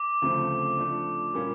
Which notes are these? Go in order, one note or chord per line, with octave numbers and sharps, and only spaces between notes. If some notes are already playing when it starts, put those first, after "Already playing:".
Already playing: D6
D2 C#3 F3 A3 C4
F3 A3 D4
A#2 G3 A#3 C#4 F4